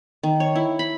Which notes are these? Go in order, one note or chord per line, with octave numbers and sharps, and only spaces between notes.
D#3
C#5
E4
B5